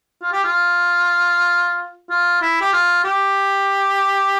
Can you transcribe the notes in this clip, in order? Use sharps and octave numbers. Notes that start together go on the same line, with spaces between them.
F4
G4
F4
F4
E4
G4
F4
G4